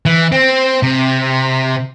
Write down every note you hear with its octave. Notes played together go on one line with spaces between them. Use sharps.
E3
C4
C3